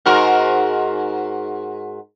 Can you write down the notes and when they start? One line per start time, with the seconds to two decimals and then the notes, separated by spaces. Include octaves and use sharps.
0.06 G#2 F#4 A#4